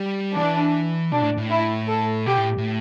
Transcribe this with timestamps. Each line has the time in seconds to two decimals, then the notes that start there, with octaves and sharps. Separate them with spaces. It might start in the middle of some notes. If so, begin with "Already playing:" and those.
Already playing: G3
0.35 E3 D4
1.12 B2 D4
1.21 A2
1.38 A2
1.50 E4
1.88 A4
2.26 B2 G4
2.37 A2
2.58 A2